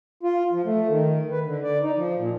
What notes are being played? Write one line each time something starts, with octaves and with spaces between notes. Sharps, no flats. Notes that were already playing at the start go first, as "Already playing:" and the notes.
F4
F3
A3
D#3
B4
D3
D5
D#4
F3
A#2